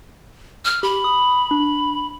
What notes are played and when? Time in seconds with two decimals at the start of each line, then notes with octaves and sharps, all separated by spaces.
0.65 F6
0.83 G4 B5
1.04 D#6
1.51 D4